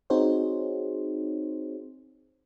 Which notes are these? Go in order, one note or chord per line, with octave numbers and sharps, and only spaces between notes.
C4 D#4 F#4 G#4 C5 C#5